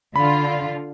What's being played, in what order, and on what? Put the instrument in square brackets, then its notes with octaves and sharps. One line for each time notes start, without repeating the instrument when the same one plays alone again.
[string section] D3 F4 [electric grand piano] B5